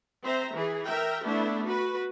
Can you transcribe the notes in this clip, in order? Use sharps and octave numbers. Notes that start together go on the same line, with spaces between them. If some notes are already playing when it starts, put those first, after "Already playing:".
C4 C5 E5 A#5
E3 G#4
A#4 E5 G5
A3 B3 D4 E4
F#4 B4